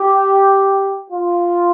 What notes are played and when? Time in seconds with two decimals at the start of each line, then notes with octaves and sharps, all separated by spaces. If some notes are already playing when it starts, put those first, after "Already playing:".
Already playing: G4
1.11 F4